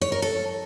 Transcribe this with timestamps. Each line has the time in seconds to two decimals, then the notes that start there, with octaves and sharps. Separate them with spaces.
0.01 C#5
0.12 A#4
0.22 A4